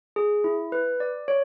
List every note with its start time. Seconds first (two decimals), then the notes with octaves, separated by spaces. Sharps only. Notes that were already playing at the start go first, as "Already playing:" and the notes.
0.16 G#4
0.44 E4
0.72 B4
1.00 D5
1.28 C#5